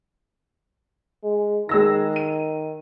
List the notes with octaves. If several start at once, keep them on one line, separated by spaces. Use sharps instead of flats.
G#3
D#3 G#3 E6 A#6
D#7